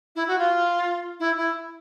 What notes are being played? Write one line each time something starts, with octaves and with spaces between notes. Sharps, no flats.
E4
F#4
F4
E4
E4